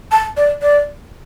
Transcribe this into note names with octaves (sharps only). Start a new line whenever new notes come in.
A5
D5
D5